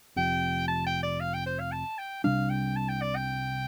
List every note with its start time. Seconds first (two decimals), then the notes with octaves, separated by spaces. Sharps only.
0.16 F1 F2 C3 G5
0.68 A5
0.86 G5
1.03 D5
1.20 F5
1.34 G5
1.46 C5
1.60 F5
1.72 A5
1.98 G5
2.24 C2 C3 G3 D4 F5
2.50 G5
2.76 A5
2.89 G5
3.01 D5
3.16 G5